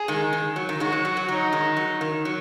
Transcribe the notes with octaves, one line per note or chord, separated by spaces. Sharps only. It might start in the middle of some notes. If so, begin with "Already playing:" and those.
Already playing: G#4
D#3 G#3
D#3
F#3
D#3
D#3 G#3 F#4
F#3
F#3
F#3
F#3 D#4
D#3 G#3
F#3
D#3
F#3